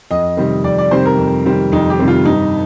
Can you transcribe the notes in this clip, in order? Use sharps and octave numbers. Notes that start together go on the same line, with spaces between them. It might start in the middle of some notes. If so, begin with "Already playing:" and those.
F2 D#5
C3 D#3 G3 C4
F2 D5
D5
C3 D#3 G3 C4 C5
A#4
F2
C3 D#3 G3 C4
F2 D#4
G4
C3 D#3 G3 C4
F4
G2 D#4